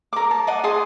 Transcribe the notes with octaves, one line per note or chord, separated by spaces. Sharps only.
A#4 D6
A5
D5 D#5 F#5
G#4 D#5 A5 C6